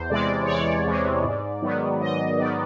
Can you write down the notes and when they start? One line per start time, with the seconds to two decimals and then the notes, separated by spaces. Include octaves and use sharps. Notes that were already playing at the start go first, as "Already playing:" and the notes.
Already playing: E2 C5
0.10 C3 E3 G#3 D5
0.43 C#5
0.48 E2 D5
0.86 C3 E3 G#3
1.24 G#2
1.62 D#3 F#3 B3
2.01 G#2 D#5
2.38 D#3 F#3 B3 D5